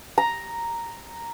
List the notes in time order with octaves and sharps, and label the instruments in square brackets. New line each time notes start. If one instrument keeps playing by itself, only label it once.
[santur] A#5